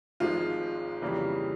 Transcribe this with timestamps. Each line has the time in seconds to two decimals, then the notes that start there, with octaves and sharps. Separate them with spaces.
0.20 G#1 G#2 F3 G#3 F4
1.02 F2 C#3 E3 G3 A#3